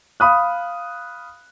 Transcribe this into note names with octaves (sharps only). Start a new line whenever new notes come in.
F5 B5 D#6 F#6